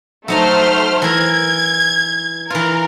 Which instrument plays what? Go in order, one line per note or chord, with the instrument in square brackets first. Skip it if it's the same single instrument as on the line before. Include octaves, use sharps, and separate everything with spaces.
[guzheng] F#3 D#4 D#5 [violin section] A3 C5 F6
[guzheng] E3 A#4 [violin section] G#6
[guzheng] E3 F4 [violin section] A#4